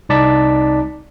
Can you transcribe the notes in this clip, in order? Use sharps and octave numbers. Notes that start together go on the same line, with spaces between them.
C2 D#4 D5 A5 B6